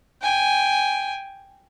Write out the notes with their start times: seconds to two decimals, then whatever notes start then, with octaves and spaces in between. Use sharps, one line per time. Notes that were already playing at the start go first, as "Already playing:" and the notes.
0.22 G5 G#5